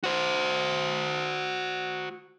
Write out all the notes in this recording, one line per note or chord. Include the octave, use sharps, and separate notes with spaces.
F#4 C5